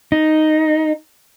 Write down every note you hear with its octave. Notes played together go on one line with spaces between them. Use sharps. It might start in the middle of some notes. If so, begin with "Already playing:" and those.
D#4